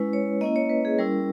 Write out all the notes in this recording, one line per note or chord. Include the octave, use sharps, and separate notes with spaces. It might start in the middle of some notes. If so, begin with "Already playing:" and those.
Already playing: G#3 C#4 E4 B4
C#5
A#3 C#4 E4 D#5
C#5
B4
G#4
G3 C#4 E4 A#4